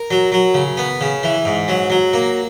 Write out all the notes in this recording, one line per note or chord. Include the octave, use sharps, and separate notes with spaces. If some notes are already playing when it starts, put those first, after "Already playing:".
Already playing: A#4
F#3
F#3
C#3
B3
C#3
E3
G#2
F#3
F#3
A#3